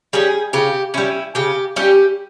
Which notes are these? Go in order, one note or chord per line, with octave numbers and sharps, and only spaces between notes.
G3 C#4 G#4
C#3 G4
G3 C#4 E4
C#3 G4
G3 C#4 G4